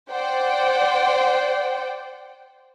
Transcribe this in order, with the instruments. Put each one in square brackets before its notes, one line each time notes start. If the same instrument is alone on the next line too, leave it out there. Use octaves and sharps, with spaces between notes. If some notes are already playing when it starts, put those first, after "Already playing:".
[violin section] C5 D5 F#5 G5